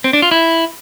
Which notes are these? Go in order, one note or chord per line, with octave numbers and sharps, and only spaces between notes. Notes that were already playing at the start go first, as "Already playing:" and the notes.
C4
D4
F4
E4